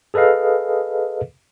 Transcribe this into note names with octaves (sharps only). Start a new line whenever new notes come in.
G#4 A4 B4 D#5 F5